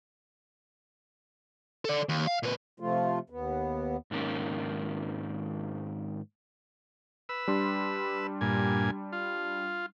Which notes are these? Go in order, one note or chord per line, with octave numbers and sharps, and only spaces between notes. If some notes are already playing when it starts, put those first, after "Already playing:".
A4 D5
D#2
F5
A#2 B4
C3 F3 A3 F4
D#2 B3
G#2 D#3 A#3 C#4
B4 E6
G3 D4 C6
G2 A#2 G#5
F4